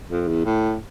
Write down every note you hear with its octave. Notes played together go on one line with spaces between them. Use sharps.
F2
E2
A2